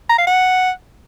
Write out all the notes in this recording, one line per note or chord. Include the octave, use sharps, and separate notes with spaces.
A#5
F5
F#5